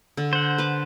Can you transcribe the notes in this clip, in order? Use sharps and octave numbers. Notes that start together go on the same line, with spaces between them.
D3
C5 F#5
B4 D6